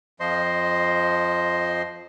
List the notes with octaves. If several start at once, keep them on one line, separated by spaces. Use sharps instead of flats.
F2 F3 C5 D#5 C6